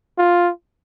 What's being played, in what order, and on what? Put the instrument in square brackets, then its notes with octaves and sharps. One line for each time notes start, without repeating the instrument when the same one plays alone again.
[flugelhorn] F4